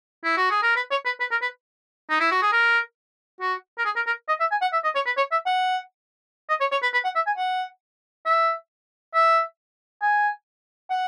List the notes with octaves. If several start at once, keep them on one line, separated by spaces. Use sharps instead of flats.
E4
F#4
G#4
A#4
B4
C#5
B4
B4
A#4
B4
D#4
E4
F#4
G#4
A#4
F#4
A#4
G#4
A#4
A#4
D#5
E5
G#5
F#5
E5
D#5
C#5
B4
C#5
E5
F#5
D#5
C#5
C#5
B4
B4
F#5
E5
G#5
F#5
E5
E5
G#5
F#5